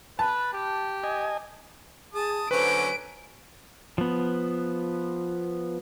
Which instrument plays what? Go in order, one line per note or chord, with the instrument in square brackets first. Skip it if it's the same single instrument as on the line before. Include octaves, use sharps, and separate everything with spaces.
[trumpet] B4 [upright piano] A5
[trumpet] G4
[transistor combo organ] D#5 G#5
[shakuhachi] G#4 [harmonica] A5 D#6
[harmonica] D3 F#3 C#4 [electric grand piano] B4 [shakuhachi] C5 [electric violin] D7
[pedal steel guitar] F3 B3